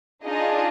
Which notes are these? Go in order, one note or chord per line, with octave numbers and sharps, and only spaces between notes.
D4 D#4 F4 G#4 D#5